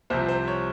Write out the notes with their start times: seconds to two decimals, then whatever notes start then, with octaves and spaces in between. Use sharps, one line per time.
0.10 C2 C3 F3 C5
0.28 C5
0.48 C#5